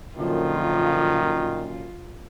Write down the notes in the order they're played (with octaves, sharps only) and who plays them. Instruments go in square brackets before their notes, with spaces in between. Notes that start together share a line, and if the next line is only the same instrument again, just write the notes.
[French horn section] F#2 A#2 [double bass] D3 F3 [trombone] D#3 [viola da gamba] F4